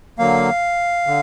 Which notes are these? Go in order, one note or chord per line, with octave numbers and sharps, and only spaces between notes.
D3 F#3 A#3 F5
D3